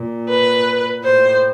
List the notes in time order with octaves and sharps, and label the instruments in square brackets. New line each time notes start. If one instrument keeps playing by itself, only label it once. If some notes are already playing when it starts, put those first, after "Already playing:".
Already playing: [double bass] A#2
[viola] B4
[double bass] A2 [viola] C5